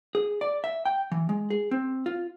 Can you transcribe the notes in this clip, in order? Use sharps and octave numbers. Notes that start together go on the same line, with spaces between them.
G#4
D5
E5
G5
E3
G#3
G#4
C4
F4